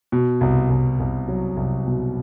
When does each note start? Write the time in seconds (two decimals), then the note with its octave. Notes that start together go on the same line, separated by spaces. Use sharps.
0.12 B2
0.41 C2
0.70 C2
1.00 C2
1.28 F#3
1.57 C2
1.87 B2